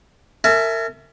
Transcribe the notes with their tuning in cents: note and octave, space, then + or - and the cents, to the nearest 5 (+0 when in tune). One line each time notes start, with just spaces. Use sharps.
A#4 -35 E5 +0 G#5 +40